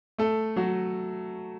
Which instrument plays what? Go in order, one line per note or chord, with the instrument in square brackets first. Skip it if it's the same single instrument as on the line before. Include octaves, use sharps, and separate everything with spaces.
[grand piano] A3 A4
F#3 F#4